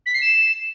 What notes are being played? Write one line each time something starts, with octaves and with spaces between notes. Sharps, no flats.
B6
C7
E7